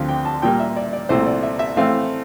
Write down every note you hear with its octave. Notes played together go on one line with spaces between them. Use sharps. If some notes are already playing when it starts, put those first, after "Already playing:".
Already playing: D2 D3 F3 C4 F5
G5
A5
A#2 G3 A#3 G5
E5
D5
D5
C2 A#2 A3 C4 C5
D5
E5
E5
A2 E3 A3 C4 F5